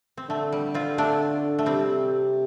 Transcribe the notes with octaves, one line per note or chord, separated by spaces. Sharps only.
C4
D3 A3
G3
C4 F4
A3 D4
A3
C3 G3 C4